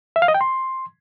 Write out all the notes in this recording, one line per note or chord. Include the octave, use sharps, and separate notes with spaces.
E5
F5
D#5
G5
C6